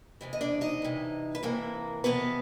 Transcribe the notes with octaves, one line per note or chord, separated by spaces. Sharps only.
F2 C3 E3
D#5
D4 D5
D#4 D#5
F2 C3 E3
B4
F2 C3 E3 A#3 A#4
F2 C3 E3 B3 B4